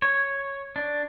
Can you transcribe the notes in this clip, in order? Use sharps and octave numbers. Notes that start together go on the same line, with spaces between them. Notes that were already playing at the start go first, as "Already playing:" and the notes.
C#5
D4